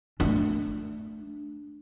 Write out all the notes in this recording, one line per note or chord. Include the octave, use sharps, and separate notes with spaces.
A3 D4